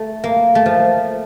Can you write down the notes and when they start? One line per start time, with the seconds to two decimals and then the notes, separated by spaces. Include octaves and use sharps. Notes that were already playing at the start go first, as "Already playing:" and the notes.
Already playing: A3
0.24 A#3
0.55 A3
0.66 F3